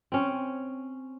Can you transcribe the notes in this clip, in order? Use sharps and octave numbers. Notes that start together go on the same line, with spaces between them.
C4 C#4